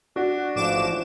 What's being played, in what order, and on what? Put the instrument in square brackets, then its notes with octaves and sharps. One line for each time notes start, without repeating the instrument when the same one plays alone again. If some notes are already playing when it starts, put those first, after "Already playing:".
[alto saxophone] D4 [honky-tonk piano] F#4
[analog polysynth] A1 D6 E7 [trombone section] G#2 F3